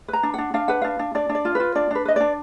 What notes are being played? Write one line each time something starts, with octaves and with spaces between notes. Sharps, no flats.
B4 A#5
D4
D4 F#5
D4 F5
B4 F#5
D4 F5
D4
D4 D5
D4
D5
F4
F4 B4
D4 D5
D4 B4
B4 D#5
D4 D5